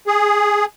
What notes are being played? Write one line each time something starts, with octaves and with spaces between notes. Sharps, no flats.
G#4